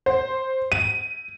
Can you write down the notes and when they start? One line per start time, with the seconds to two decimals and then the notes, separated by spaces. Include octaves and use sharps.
0.06 C5
0.72 D#7